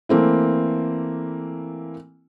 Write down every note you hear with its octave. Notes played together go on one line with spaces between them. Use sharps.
E3 A3 A#3 C4 E4